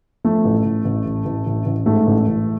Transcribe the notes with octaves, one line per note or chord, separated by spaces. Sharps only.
F3 A3
A1
A1
A1
A1
A1
A1
A1
G#2 A3
A1
A1